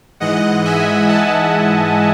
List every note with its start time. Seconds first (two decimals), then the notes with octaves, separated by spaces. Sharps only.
0.20 G#2 E3 G#3 D#5 F#5
0.65 E5 G#5
1.08 F#5 A5